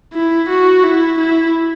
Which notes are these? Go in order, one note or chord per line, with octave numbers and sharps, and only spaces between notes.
E4
F#4
E4
E4